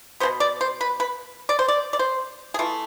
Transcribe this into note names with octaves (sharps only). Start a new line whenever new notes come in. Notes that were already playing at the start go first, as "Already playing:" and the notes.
B2 G#3 B3 C5
D5
C5
B4
B4
D5
C5
D5
D5
C5
G#4
E3 A3 F4